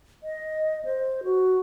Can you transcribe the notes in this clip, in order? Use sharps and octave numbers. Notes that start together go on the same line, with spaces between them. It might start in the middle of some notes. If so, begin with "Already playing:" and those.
D#5
C5
F#4